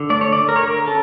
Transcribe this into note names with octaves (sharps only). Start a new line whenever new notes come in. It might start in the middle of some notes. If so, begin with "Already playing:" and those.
Already playing: D3
A3 D5
C#5
D3 D5
A#4
C#5
D3 A#4
C#4 A4